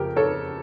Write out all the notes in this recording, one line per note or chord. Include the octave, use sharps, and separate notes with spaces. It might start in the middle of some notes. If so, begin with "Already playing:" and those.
Already playing: F2 C#3 F3 G4 A#4
A4 C#5